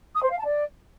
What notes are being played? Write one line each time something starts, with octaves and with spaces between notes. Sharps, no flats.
D#6
C5
F5
A5
D5